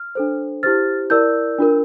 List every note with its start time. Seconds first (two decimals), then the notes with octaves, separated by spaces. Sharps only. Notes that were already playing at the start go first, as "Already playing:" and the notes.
Already playing: F6
0.15 D4 A4 C5
0.63 E4 G4 C5 F6 A6
1.10 E4 A#4 D5 E6 G6
1.59 D4 F4 A#4